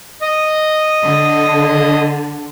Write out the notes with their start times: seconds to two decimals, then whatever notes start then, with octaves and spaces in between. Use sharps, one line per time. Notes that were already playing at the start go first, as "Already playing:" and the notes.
0.21 D#5
0.99 D3